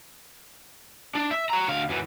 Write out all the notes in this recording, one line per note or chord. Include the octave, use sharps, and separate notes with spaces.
D4
E5
C#5 A#5
D2 F5
F#2 E3